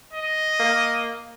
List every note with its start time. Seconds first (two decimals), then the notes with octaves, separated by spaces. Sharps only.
0.13 D#5
0.60 A#3